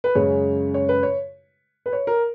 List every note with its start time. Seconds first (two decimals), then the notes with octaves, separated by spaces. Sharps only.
0.04 B4
0.15 F#2 C#3 G#3 C#5
0.74 C#5
0.89 B4
1.03 C#5
1.86 B4
1.93 C#5
2.07 A#4